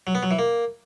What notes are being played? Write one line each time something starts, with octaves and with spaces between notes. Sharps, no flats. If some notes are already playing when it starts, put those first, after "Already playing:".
F#3
B3
F#3
E3
A#3